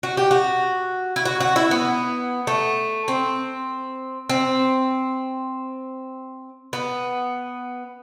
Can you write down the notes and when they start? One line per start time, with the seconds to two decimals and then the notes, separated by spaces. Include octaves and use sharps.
0.03 F#4
0.17 G4
0.31 F#4
1.16 E4
1.25 F#4
1.40 F#4
1.56 E4
1.71 B3
2.47 A3
3.08 C4
4.30 C4
6.73 B3